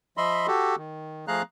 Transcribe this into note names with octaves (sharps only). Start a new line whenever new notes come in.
F3 D#5 E5 B5 C6
F#4 G4 A4
D#3
F3 A3 G#4 F5 A#5 F#6